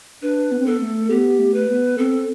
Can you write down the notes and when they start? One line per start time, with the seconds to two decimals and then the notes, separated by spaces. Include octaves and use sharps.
0.22 D4 B4
0.52 B3
0.59 C4
0.66 B3 A4
0.81 A3
1.10 B3 G4
1.39 A3
1.54 B4
1.69 B3
1.98 C4 A4